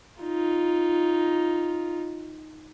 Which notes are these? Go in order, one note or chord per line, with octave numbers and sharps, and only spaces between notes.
D#4 F4